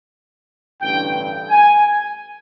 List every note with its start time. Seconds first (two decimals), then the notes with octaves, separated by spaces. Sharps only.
0.81 A1 G2 D3 G5
1.49 G#5